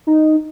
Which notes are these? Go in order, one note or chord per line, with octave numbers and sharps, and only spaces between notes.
D#4